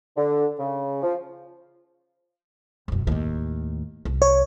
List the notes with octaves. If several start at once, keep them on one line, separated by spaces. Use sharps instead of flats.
D3
C#3
F3
E1 F#2
D#2 A2
C2
C#5